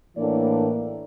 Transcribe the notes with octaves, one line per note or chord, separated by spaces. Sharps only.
A2 E3 A#3 D4 D5